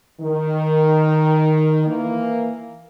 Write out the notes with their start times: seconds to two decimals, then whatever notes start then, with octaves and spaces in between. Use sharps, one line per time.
0.21 D#3
1.87 E3 A#3